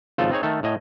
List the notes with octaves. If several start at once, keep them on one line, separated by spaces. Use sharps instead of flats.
G#1 C#3 F3 F4 A4
C4 D#4 G#4 C#5
D#3 A3 A4
A2 D#5 G#5